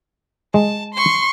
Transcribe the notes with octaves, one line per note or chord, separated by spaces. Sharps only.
G#3 A5
C6 C#6